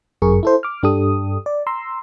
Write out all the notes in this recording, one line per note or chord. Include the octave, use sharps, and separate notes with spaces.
G1 F#2 G#4 A#4 C#6
E4 A4 C5
D6 F6
G2 D4 G4 A4 D#6
D5
A#5 C6 E6